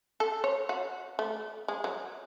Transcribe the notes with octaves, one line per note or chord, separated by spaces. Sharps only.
A4
C#5
F#4
A3
G#3
F#3